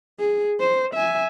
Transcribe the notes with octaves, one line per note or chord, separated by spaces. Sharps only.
G#4
C5
E5 G#5